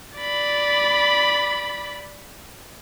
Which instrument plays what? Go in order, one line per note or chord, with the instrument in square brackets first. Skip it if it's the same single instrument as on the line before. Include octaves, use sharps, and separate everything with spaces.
[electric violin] D5 B5